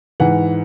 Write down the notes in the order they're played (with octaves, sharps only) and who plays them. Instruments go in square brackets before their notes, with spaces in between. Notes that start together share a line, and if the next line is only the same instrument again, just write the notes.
[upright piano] G#2 E3 F#5